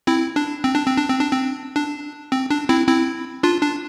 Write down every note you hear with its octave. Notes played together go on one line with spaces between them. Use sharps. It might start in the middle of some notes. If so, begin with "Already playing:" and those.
C4 E4
D4
C4
D4
C4
D4
C4
D4
C4
D4
C4
D4
C4 E4
C4 E4
D4 F4
D4